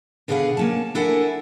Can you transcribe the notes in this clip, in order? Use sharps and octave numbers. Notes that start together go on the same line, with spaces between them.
B2 D3 G#4 B4 F5 F#5
A#3 C#4 A5
D4 E4 A4 A#4 F#5 G#5